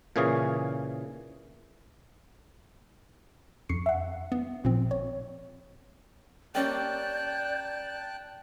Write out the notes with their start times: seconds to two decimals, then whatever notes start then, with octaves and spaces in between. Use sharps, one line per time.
0.16 A#2 C#3 E3 G#4 C#5 F5
3.69 F2 C#6 C7 C#7
3.86 E5 F#5
4.32 B3
4.64 A1 A#2 F3 C4
4.91 C#5
6.55 A#3 C#4 G4 D5 G5 A5 F#6 G6